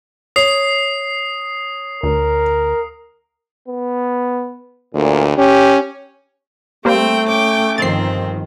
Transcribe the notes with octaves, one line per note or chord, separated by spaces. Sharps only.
C#5 D#6 C7
D2 A#4
B3
D2 A#2
C#4 G4
G3 A3 A#3 C4 C5 G5
C#4 G5 D6
G1 D#3 F3 C4 A6 C7